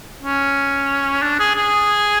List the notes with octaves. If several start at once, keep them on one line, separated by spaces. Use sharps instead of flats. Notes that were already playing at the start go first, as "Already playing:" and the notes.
C#4
D4
G#4
G#4